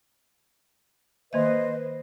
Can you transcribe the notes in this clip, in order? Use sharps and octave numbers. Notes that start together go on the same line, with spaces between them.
D#3 A#3 B4 C5 D#5 E5